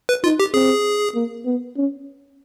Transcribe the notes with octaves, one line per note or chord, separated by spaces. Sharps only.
B4
D#4 F4
G4
C4 G#4
A#3
B3
C#4